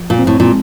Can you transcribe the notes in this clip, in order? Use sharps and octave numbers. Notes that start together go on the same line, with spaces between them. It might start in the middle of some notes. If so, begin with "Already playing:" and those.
Already playing: F3
A#2
C4
A2
A#2
G#3